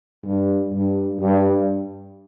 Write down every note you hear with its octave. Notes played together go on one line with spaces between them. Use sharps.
G2
G2
G2